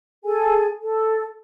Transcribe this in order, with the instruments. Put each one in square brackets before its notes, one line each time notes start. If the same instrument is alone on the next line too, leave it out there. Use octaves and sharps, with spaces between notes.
[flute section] G#4 A4 G#5
A4